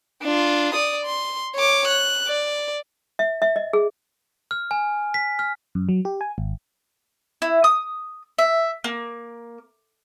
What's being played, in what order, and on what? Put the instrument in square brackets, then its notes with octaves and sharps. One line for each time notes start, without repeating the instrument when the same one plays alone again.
[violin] D4 F4
D5 D#6
C6
C#5 D6
F#6
D5
[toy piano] E5
E5
D#5
G#4
[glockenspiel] F6
G#5
B6
F6
[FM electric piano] F#2
F#3
G4
G#5
G#1
[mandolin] E4
D#6
E5
A#3